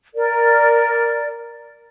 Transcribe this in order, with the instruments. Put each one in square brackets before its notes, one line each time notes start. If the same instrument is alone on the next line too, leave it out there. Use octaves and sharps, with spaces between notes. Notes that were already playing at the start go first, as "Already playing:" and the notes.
[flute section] A#4 D5